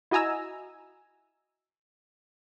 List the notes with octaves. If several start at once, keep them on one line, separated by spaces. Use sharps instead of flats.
E4 F#4 D#5 G#5 A#5 E6